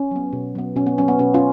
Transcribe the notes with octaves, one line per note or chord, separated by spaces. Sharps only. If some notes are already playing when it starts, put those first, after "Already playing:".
Already playing: C#4
F#3 B3
B2
F#3 B3
B2 C#4
B3
F#3 B3 C#4
B3
B2 C#4
C#4 F4